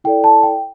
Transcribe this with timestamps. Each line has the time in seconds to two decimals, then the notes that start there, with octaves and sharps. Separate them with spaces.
0.04 E4 A4 D5 G5
0.24 A5
0.43 G5